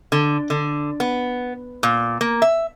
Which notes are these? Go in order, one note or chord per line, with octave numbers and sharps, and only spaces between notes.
D3
D3
B3
A#2
A#3
E5